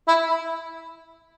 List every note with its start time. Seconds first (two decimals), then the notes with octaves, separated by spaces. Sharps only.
0.08 E4